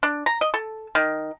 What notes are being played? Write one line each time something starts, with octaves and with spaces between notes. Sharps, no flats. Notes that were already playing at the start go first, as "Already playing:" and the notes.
D4
A#5
D#5
A4
D#3